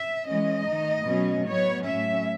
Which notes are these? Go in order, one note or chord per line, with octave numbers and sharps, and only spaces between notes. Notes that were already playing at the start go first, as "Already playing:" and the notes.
Already playing: E5
E3 G#3 C#4 D#5
D#3 A3 D#4
B2 F#3 A3 C#4
A2 F#3 B3 C#5
A2 F#3 A3 C#4 E5